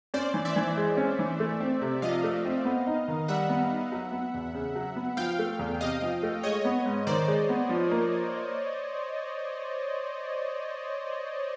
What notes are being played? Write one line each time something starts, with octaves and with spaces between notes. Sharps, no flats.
C#4 C5 D5
E3
D5 E5
E3
G#3
C#4
E3
A3
C4
C3
F3 D#5 F5
A3
C4
B3
D#4
D#3
G3 E5 F#5
B3
D#4
F#3
B3
E2
C#3
F#3
B3
F3 F5 G5
A3
E2
C3 D#5 F5
F3
A3
G#3 C#5 D#5
B3
G#2
D#3 C5 D5
G#3
B3
F3
A#3